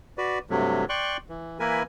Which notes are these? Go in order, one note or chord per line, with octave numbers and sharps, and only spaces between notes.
F#4 B4 D5
G2 C3 F#3 A3
D5 G5 C6 C#6 F#6
E3
E3 A#3 E4 A#4 B4 G#5